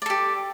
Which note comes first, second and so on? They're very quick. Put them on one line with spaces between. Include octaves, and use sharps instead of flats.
D5 A4 G4